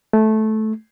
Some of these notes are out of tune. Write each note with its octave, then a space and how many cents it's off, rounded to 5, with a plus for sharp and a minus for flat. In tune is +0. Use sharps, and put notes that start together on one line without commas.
A3 -15